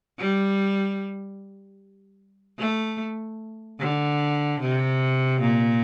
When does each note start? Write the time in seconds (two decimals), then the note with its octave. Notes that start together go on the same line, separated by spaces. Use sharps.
0.18 G3
2.58 A3
3.80 D3
4.60 C3
5.41 A#2